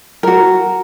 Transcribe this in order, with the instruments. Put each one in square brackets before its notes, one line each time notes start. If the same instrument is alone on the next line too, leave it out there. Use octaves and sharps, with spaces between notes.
[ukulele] F#4 A#4